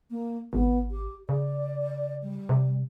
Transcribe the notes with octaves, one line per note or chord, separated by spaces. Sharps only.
A#3
G#1 B3
G4
C#3 D5
G3
C3